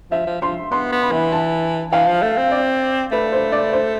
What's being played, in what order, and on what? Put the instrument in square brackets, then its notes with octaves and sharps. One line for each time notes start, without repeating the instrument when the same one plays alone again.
[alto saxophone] F3 [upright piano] E5
[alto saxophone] F3
[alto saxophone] F3 [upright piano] C6
[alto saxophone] B3 [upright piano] C6
[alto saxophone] B3
[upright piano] B5
[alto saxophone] E3
[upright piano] A5
[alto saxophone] E3 [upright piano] F5
[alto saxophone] F3
A3
C4
[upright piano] D5
[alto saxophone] A3 [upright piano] B4
[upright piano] C5
D5
C5